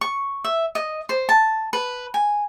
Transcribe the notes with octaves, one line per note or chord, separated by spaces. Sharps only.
C#6
E5
D#5
C5
A5
B4
G#5